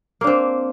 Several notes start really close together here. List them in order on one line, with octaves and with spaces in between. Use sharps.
A#3 D4 C4